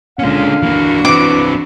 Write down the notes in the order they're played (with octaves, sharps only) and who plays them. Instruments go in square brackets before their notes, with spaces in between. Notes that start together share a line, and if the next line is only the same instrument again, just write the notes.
[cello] A#2 D3 [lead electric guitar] G#3 C#4 [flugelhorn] F5
[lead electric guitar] E3 A#3 [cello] D4 F#4
[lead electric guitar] E3 C4 [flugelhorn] B4 [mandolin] D6